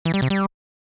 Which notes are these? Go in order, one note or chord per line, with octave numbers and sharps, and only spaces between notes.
E3
G3
C3
G3